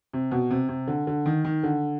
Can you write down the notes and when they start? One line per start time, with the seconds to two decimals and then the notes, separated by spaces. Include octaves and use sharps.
0.13 C3
0.32 B2
0.51 C3
0.69 C3
0.87 D3
1.07 D3
1.26 D#3
1.45 D#3
1.63 D3